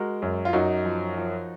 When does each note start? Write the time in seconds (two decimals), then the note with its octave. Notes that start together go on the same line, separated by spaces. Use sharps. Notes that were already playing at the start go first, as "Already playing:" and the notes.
Already playing: G#3 F#4 A#4
0.22 F#2
0.45 F4
0.53 F#2 D#4 F#4
0.85 F3
1.18 F3